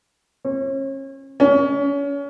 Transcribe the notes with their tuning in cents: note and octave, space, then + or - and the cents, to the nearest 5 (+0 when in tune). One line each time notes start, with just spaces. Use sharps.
C#4 -35
C#4 +30